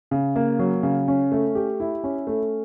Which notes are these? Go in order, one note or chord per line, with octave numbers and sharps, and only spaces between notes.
C#3
A#3
F#3
C#3
C#4
A3
G4
E4
C#4
A3